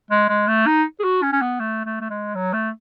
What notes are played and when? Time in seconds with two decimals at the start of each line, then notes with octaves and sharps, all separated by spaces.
0.11 G#3
0.29 G#3
0.48 A3
0.67 D#4
1.00 G#4
1.04 F#4
1.23 C#4
1.33 C#4
1.42 B3
1.60 A3
1.85 A3
2.01 A3
2.10 G#3
2.35 F#3
2.53 A3